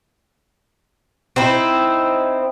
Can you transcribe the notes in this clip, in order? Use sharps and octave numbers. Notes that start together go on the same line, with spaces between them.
C4 D#4 E4